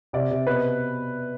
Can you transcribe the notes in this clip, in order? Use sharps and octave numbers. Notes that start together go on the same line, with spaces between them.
C3 D5
C3
B2 B4